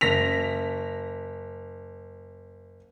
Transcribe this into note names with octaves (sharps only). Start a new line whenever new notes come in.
F#1 A#6 B6 F7